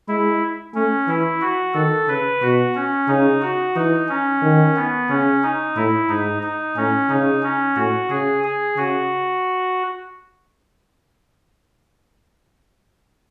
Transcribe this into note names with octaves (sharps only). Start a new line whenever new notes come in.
G#3 E4
A3 C#4
E3 E4
F#4
D#3 A4
C#3 B4
B2 F#4
C#4
C#3 D#4
F#4
E3 D#4
C#4
D#3
B3
C#3 C#4
D#4
A2 E4
G#2 D#4
D#4
A2 C#4
C#3 D#4
C#4
A2 F#4
C#3 G#4
G#4
C#3 F#4